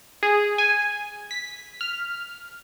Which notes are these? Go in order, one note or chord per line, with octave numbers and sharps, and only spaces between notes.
G#4
G#5
B6
F6